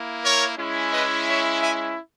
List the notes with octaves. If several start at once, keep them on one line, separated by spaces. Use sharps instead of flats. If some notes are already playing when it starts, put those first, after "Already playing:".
Already playing: A#3 E4
A#4 C#5
G#3 C#4 E4
B4 D#5
C#5 E5
E5 G#5